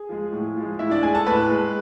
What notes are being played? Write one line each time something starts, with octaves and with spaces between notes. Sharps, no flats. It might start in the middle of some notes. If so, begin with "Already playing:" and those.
Already playing: G#4
F3 G#3
A2
F3 G#3
A2 E4 E5
D4 D5
G#3 G#4 G#5
A4 A5
A2 B4 B5
G#3